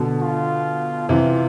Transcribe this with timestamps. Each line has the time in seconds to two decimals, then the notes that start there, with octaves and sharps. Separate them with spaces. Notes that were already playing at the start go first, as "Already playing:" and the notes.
Already playing: B2 D3
0.22 F4
1.09 C3 E3 F4